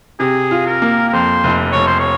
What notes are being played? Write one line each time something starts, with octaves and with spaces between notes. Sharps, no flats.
C3 G#4
F4
A#4
A#3
A#4
F2 C5
F1
F1 C#5
C5
C#5